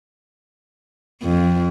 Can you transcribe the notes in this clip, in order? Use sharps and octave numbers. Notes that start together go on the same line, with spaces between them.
F2